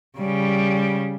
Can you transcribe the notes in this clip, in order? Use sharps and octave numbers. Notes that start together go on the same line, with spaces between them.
C#3 G3